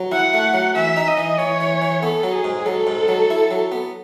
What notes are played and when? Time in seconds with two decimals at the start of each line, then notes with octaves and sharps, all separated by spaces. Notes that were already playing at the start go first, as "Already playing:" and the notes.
Already playing: F#3
0.12 E4 F#5
0.34 A3
0.54 F#3
0.75 E3 E5
0.96 D#4
1.08 D#5
1.18 E3
1.39 E3 C#5
1.60 E3
1.82 E3
2.02 B3 A4
2.23 F#3
2.34 G#4
2.44 G#2
2.66 F#3 A4
2.87 G#2
3.08 F#3
3.30 E4
3.51 F#3
3.72 B3